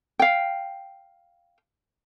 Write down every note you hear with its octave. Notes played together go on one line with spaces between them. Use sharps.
F5 G5